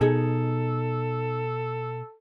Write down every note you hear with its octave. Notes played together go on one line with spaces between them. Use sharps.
B2 D#4 G#4 A4